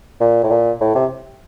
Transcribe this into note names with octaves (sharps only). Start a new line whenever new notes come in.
A#2
A2
A#2
A2
C3